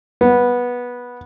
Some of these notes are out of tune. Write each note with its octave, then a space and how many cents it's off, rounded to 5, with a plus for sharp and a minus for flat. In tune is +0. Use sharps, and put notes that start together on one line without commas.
B3 -10